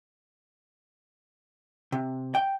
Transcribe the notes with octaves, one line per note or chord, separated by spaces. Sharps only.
C3
G5